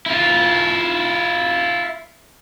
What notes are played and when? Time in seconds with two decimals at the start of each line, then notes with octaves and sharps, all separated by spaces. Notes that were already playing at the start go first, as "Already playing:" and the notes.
0.06 E4 F4